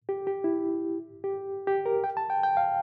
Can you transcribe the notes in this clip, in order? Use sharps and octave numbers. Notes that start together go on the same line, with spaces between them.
G4
G4
E4
G4
G4
A#4
G5
A5
G5
G5
F5